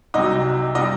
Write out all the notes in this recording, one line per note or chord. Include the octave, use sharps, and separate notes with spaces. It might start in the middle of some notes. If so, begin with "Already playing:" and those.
C2 C3 F#3 D#4 D#5
C3 G3 D#4 D#5